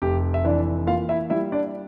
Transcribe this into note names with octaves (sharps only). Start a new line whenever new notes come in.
F1 G4
E5
E3 D4 D5
A#3 F4 F5
E4 E5
G3 E4 E5
D4 D5